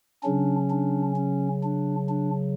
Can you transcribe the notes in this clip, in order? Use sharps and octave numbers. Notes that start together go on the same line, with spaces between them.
C#3 F#3 C#4 D4
D4
C#4
D4
D4